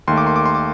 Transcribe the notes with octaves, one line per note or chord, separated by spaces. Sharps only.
D#2 D#3 A3 C6
D6
C6
D6
C6
D6